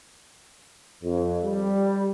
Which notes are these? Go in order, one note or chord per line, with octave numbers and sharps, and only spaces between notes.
F2
G3